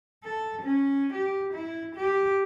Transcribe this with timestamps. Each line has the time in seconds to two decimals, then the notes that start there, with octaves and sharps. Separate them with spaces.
0.24 A4
0.62 C#4
1.13 G4
1.53 E4
1.95 G4